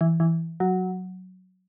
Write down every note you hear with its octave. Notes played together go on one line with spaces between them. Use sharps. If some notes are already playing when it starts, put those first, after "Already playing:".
E3
E3
F#3